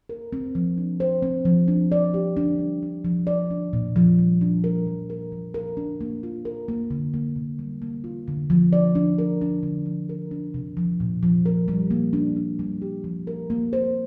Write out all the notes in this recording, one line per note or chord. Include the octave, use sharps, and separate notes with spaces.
A#4
C4
F3
D4
C5
C4
F3
D4
D5
G4
D4
G3
D4
F3
D5
D4
A#2
F3
G3
D4
A#4
F3
A#4
F3
A#4
D4
A#3
F4
A#4
A#3
D3
A#3
C3
G3
A#3
F4
D3
F3
D5
D4
A#4
D4
D3
F3
A#4
D4
C3
F3
A#2
F3
A#4
G3
A#3
D4
D4
G3
G4
F3
A#4
A#3
C5